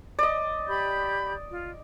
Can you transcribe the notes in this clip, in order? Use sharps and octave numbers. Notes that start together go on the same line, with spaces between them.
D5 D#5
G4 B5 G6
F4